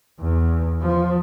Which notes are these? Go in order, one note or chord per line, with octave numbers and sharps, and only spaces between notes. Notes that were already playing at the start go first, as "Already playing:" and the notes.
E2
F3